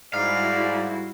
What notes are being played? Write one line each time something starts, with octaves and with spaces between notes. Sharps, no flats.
G#2 G3 E4 F#4 D5 F5